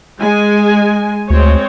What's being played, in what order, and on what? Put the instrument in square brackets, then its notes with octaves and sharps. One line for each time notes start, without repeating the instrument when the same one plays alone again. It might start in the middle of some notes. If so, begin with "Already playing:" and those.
[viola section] G#3 G#5
[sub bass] D2 [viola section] G#3 C4 C#5